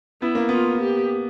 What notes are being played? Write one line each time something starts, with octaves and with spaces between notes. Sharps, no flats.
B3 E4
A#3
B3 F4
G4